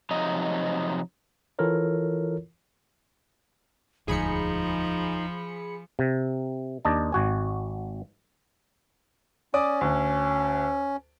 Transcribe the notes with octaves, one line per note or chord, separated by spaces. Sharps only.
C3 F3 F#3 D#4 D#5
E3 E4 F4 A4 A#4 C#5
E1 D2 G#2 F3 D#4 G#4 B5 C#7
C3
D#2 D4 D#5 A5
G#1 F#4 G#5
C#4 D5 D6 D#6
D2